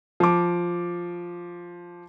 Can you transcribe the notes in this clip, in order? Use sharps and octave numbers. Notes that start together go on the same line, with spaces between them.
F3 D6